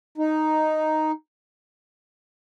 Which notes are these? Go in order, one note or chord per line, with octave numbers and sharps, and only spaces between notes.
D#4